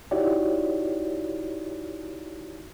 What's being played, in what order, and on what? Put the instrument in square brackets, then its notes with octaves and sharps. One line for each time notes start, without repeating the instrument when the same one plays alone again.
[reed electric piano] D#4 E4 F#4 G4 C#5 D5